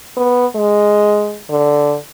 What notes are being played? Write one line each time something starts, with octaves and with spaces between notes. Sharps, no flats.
B3
G#3
D3